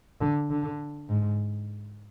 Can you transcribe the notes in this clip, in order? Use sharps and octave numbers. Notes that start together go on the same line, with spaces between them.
D3
D3
G#2